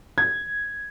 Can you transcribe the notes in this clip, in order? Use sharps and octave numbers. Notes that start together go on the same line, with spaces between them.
G#6